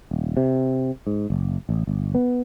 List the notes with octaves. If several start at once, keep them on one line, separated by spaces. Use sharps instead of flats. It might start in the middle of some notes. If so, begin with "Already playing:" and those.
D#1
C3
G#2
F#1
A1
G1
B3